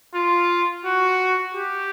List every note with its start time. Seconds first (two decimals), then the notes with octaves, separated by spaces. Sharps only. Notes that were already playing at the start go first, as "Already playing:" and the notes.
0.15 F4
0.85 F#4
1.55 G4